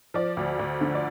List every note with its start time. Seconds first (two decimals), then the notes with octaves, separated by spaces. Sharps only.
0.14 F3 D5
0.37 D2
0.59 D2
0.81 D3
0.95 D5